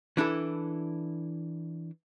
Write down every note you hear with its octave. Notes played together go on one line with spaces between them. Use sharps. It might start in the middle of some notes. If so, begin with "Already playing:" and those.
E3 D4 E4 A4